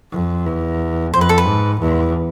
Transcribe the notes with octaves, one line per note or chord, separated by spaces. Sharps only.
F2
E2
F2 C5
B4
A4
B4
G#2
E2